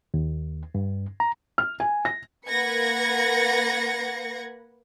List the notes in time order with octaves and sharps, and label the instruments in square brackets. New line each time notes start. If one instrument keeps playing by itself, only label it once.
[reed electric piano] D#2
G2
A#5
[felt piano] F6
G#5
A#6
[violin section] A#3 B4 F#5 G#6 A#6 C#7